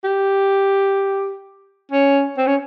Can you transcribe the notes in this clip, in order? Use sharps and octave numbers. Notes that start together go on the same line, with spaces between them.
G4
C#4
C4
C#4